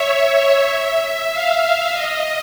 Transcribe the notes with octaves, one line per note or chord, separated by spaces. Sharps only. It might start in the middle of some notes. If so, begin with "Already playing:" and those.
Already playing: C#5 E5
F5
E5
D#5